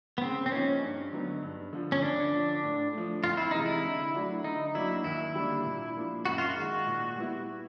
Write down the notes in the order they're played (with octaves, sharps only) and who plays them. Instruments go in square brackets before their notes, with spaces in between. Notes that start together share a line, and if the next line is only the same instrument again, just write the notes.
[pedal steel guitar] B3
[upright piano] C#3 [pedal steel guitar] C4
[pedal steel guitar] C4
[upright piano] F3 A#3 D#4 [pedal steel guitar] C#4
[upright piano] G2
D3 F#3 B3 D#4
G2
D3 F3
[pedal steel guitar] C#4
[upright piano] D2 [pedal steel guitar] D4
[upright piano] D3 F3
A2
F3 A3
[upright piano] F2 [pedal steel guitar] F4
[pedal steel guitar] E4
[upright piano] C3 E3 G#3 [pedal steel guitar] D#4
[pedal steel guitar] E4
[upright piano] D3
F#3 A3 D4 F#4
[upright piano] D3 [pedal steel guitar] D#4
[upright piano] F#3 A#3 D4 F#4 [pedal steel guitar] E4
[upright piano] D#2 [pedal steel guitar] E4
[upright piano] D3 G3 A#3 D4
A#2
F3 A#3 D4
[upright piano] F#2 [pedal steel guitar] F#4
[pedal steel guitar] F4
F#4
[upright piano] D#3 G#3
A#2
G3 B3 E4